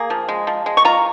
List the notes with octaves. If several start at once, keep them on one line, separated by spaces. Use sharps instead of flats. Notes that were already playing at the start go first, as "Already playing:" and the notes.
Already playing: A#3 G#4
F3
G#3
F3
G#3
C#6
F4 A#5